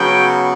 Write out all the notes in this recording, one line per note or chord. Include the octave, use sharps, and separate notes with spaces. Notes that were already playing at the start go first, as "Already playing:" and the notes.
Already playing: C#3 F#3 B3 G5